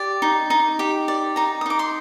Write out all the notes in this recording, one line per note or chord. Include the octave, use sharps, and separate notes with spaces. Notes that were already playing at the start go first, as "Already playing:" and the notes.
Already playing: G4 D5
D#4
D#4
G4
D5
D#4 A#5
D#6
D#4 D6
C6